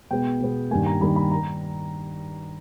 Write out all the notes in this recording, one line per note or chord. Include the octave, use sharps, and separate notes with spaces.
B2 G#3 B3 G5
B2 G#3 B3
G2 D#3 G3 A#3 G#5
A#5
G2 D#3 G3 A#3 B5
B5
A#5